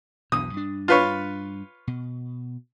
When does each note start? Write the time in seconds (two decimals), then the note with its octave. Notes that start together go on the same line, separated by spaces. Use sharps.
0.32 B1 E2 B2 D#6
0.54 G2 D4
0.88 F4 B4 C#5
1.87 B2